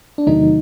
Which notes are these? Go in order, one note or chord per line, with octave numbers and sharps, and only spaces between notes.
D4
E2 C3 D#3 F#3 A3 D#4